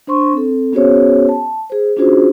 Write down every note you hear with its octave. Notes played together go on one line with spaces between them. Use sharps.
D4 C5 C6 C#6
C4 A4
B3 C#4 F#4 G#4 C5 C#5
A5
G#4 C5
C#4 D4 F4 F#4 G#4 C5